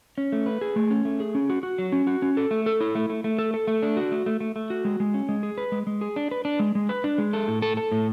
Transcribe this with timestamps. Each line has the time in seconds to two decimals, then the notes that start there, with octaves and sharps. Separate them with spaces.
0.18 C#4
0.32 A3
0.46 B4
0.61 G#4
0.76 A3
0.91 C#4
1.05 A3
1.20 G#4
1.35 C#4
1.50 F#4
1.63 F#4
1.78 F#3
1.92 C#4
2.07 F#4
2.22 C#4
2.37 A4
2.51 A3
2.66 A4
2.80 E4
2.95 A3
3.10 A3
3.24 A3
3.39 A4
3.54 A4
3.67 A3
3.82 D4
3.97 F#4
4.12 A3
4.26 A3
4.41 A3
4.56 A3
4.70 F#4
4.85 G#3
5.00 G#3
5.14 C#4
5.29 G#3
5.43 G#4
5.58 B4
5.72 G#3
5.87 G#3
6.01 G#4
6.16 D4
6.31 B4
6.45 D4
6.59 G#3
6.75 G#3
6.89 B4
7.04 D4
7.18 G#3
7.33 A4
7.48 A2
7.62 A4
7.77 A4
7.92 A2